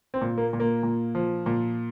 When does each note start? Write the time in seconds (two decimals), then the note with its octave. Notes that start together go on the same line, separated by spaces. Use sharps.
0.14 C4
0.21 A#2
0.38 A#3
0.53 A#2
0.60 A#3
0.83 A#2
1.15 F3
1.46 A#2